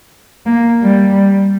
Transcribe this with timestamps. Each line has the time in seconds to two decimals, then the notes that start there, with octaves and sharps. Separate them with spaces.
0.47 A#3
0.85 G3